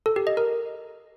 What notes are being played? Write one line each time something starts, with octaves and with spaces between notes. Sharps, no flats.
A4
G4
D#5
A#4